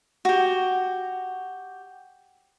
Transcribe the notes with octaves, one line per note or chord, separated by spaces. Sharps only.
F#4 G4